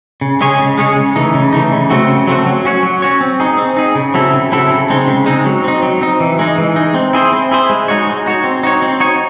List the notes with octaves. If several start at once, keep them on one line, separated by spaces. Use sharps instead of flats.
C#3
G#3 C#4 G#4 C#5
C#3
G#3 C#4 G#4 C#5
C#3
E3 A3 D#4
C#3
E3 A3 D#4
C#3
F#3 A3 C4 F#4
C#3
F#3 A3 C4 F#4
F#3
C#4 F#4 C#5
F#3
C#4 F#4 C#5
C4
D#4 G#4
C4
D#4 G#4
C#3
F#3 C4 E4 A4
C#3
F#3 C4 E4 A4
C#3
G#3 C4 D#4
C#3
G#3 C4 D#4
F#3
C4 D#4
F#3
C4 D#4
E3
G#3 D#4
E3
G#3 D#4
C4
E4 G#4 C5
C4
E4 G#4 C5
G#3
D#4 F#4 C#5
G#3
D#4 F#4 C#5
C4
D#4 F#4 C#5
C4
D#4 F#4 C#5